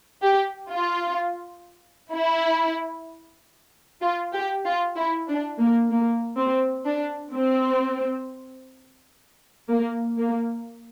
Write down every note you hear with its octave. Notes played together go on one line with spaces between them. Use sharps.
G4
F4
E4
F4
G4
F4
E4
D4
A#3
A#3
C4
D4
C4
A#3
A#3